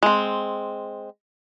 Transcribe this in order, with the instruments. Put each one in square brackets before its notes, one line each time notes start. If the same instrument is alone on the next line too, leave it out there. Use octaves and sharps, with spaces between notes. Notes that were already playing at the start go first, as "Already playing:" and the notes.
[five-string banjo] G#3 C4